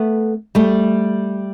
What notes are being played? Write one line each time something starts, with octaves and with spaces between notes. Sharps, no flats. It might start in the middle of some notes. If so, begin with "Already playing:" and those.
Already playing: A3 B3
G3 A3